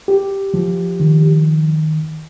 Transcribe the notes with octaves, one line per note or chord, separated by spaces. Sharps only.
G4
F3
D#3